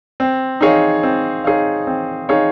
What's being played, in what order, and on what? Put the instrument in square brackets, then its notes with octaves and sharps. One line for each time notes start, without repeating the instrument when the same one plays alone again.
[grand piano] C4
D#4 G#4 C#5 F5
C4
D#4 G#4 C#5 F5
C4
D#4 G#4 C#5 F5